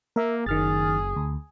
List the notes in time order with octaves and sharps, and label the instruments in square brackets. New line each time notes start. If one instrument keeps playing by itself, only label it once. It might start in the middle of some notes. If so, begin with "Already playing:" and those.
[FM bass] A#3 [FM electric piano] A#4 E5
[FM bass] F#1 [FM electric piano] D#3 F6 A6 [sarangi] G#4
[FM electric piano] D2